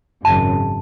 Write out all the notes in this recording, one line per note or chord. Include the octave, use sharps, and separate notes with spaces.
G#1 F#2 C#3 A5